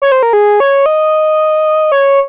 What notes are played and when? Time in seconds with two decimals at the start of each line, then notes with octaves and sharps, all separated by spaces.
0.02 C#5
0.12 C5
0.23 A#4
0.33 G#4
0.60 C#5
0.86 D#5
1.92 C#5